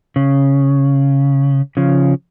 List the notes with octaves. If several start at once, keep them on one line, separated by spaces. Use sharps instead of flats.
C#3
C#3 F3